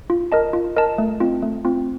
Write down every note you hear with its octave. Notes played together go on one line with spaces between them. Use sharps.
F4
A#4 D#5 A5
F4
A#4 D#5 A5
A3
C4 F4
A3
C4 F4